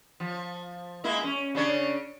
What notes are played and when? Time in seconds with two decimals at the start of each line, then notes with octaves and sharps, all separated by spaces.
0.20 F3
1.04 G#3 A#3 E4
1.24 C#4
1.55 C#3 D4 C#5